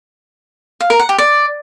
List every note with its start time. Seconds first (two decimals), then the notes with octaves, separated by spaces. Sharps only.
0.81 F5
0.90 A#4
0.99 F#5
1.09 G4
1.18 D5